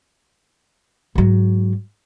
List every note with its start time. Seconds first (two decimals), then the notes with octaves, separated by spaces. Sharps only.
1.15 G#2 F#3